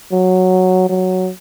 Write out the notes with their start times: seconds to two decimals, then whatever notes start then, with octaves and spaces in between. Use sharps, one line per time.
0.12 F#3
0.89 F#3